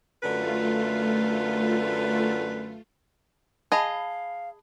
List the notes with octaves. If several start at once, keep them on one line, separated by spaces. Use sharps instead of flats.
F#2 D3 A3 F4 B4
G#4 D#5 F5 A5 B5